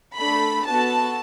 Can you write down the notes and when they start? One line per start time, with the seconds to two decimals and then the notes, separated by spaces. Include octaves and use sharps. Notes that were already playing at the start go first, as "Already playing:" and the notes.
0.17 A3 D4 A4 B5
0.66 B3 F#4 A4 A5